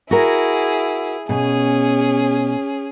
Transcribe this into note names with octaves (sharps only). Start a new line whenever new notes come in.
E4 F#4 G#4 A#4
B2 C#4 G#4 G#5